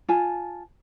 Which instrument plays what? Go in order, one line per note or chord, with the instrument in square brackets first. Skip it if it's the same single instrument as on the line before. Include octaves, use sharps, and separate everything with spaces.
[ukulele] F4 G#5 A5